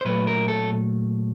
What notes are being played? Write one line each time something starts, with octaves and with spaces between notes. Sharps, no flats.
C5
A#2 F#3 A3 B4
A#4
A4